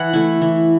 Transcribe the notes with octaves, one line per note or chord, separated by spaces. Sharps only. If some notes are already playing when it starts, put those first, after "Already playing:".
Already playing: E3 F#5
A3 E4
E3